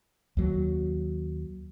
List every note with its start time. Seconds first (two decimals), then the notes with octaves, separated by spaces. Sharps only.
0.37 D#2 F#3